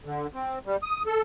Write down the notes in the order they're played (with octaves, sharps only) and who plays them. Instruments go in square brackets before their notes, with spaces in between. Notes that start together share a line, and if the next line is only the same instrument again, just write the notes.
[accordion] D3
C4
G3
D#6
A4